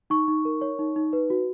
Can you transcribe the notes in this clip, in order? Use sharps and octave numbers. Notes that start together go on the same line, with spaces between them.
D#4 C#6
D#4
A#4
C#5
D#4
D#4
B4
F#4